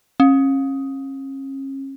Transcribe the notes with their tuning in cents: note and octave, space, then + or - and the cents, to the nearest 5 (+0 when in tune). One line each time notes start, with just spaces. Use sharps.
C#4 -35